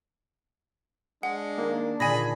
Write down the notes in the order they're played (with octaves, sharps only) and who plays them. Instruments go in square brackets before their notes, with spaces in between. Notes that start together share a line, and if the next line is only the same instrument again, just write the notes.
[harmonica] G#3 [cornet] D4 [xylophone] F#5
[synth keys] D#3 A#3
[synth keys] A#2 D3 D#3 [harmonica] G#4 B5 [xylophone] D5 G#5 A#6